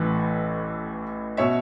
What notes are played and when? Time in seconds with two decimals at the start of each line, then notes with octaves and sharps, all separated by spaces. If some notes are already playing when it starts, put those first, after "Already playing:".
Already playing: A1 A2 E3 B4
1.37 B2 C#5 E5